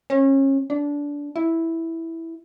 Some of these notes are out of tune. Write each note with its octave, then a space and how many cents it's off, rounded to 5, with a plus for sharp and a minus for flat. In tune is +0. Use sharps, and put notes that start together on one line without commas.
C#4 -30
D4 -20
E4 -5